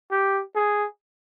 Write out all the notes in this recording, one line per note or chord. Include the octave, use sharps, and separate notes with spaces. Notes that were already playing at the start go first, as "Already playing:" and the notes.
G4
G#4